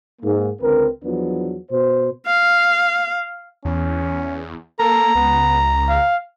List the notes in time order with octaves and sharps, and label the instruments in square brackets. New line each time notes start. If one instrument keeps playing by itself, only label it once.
[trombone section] G#2 A#3
C#2 D3 C4 A#4 B4
E2 F3 F#3 B3 D4
B2 C5
[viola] F5
[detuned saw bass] E2 [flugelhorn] C#4
[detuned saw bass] A#3 [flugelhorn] A4 [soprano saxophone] A#5
[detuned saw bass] C#2 [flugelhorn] B3
[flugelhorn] F5